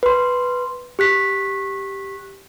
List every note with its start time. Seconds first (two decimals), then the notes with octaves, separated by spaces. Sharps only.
0.03 B4 C6
0.99 G4 F#6 B6